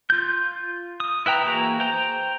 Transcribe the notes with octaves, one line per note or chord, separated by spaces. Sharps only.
F4 G6
D#6
E4 B4 G5 A#5
E3 A#3 F#4 G#4 A#5
C5 G5 A#5